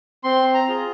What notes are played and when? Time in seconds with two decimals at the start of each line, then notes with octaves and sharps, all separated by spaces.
0.24 C4 C6
0.54 A#5
0.68 F4 G#4